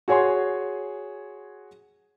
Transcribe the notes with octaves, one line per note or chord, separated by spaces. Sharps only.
F#4 G#4 C#5 G#5 C6